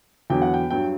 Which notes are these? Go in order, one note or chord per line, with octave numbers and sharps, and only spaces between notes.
E2 D3 F#3 G5
F#5
G5
G2 F#3 G5